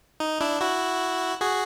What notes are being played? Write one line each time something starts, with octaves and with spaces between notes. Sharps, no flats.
D#4
D4 E4
E4 F#4
F#4 G#4